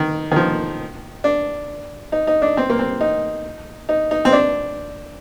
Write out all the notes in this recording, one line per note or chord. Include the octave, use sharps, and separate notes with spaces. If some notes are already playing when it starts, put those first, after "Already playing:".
Already playing: D#3
D#3
F3
D4
D#4
D#4
D4
C4
A#3
C4
D#4
D#4
D#4
C4
D4